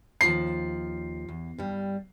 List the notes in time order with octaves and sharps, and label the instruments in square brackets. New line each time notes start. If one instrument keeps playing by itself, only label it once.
[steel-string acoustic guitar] D#2 F3 [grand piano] C7
[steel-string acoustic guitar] E2
G2 G3